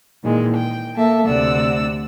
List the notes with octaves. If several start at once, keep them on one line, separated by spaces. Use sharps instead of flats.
A#2 D#3 E3 G#3
G5
A#3 A4 E5 A5
D2 C3 D5 F#5 E6